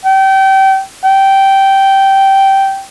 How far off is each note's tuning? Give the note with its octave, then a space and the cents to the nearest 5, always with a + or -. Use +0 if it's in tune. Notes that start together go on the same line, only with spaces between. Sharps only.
G5 -30
G5 -10